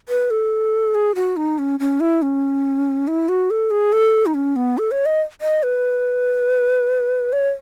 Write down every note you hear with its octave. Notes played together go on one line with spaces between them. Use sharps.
B4
A4
G#4
F#4
D#4
C#4
C#4
E4
C#4
E4
F#4
A4
G#4
A4
D#4
C#4
B3
A4
C#5
D#5
D#5
B4
C#5